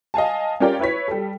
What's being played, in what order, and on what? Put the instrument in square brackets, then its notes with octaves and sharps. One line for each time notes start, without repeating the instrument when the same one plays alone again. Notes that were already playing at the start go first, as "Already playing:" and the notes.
[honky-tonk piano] D#5 F5 G#5 A5
C#4 F4 G4 A#4 D5 G5
E4 B4 C#5 B6
G3 A4